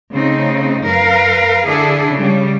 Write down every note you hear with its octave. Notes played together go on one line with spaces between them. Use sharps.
C#3 A3 C4 D#4
F#2 A#4 B4 F5
D3 D4 E4 G#4 A4
C#3 G3